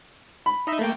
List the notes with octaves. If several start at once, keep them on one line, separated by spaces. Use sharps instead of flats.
B5
D#4 D#5 E5
A3 A#3 G5